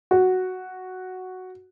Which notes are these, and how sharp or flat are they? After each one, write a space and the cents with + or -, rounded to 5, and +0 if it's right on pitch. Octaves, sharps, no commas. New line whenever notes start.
F#4 +0